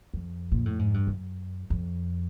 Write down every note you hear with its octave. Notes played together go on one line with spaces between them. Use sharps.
F2
A#2
A2
G#2
G2
F#2
F2